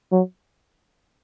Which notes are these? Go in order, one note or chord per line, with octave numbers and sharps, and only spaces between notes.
F#3